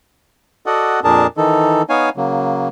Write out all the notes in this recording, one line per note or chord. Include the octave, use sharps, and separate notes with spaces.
F#4 A4 D5 D#5 F#5
F2 A#2 D4 G#4 A#4 A5
D#3 E3 D#4 A4
B3 D#4 C#5 F5 G#5
C#3 F#3 A#3